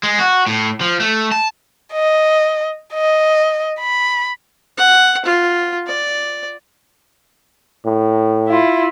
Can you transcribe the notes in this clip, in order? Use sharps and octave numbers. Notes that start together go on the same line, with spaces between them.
G#3
F#4
A2
F3
A3
A5
D#5
D#5
B5
F#5
F4
D5
A2
E4 F4